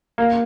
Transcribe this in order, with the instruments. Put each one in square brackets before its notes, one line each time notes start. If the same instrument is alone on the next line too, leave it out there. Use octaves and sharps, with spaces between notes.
[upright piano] A#3